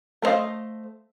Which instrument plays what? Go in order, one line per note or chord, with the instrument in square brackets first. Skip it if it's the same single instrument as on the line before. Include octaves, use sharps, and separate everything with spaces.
[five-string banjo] A3 A#4 C5 D#5 F5